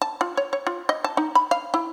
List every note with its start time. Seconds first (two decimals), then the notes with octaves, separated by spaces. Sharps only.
0.02 A5
0.21 F4
0.37 C#5
0.53 C#5
0.67 F4
0.89 D#5
1.04 A5
1.17 D#4
1.35 B5
1.51 F5
1.74 E4